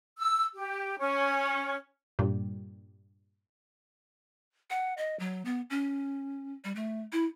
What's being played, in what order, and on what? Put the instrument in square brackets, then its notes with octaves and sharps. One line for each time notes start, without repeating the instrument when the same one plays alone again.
[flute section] E6
G4
C#4
[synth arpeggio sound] G2 A#2 G3
[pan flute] F#5
D#5
F#3
B3
C#4
G3
A3
E4